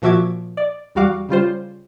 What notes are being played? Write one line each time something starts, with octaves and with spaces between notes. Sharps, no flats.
A#2 F3 F#4 E5 D6 G#6
D5
E2 G3 F#4 F5 D6
C#3 G3 F4 C5